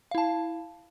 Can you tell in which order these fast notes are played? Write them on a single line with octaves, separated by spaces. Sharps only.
F5 E4 A5